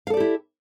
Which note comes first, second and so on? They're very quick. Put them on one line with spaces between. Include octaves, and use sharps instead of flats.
F5 A4 D5 G4 E4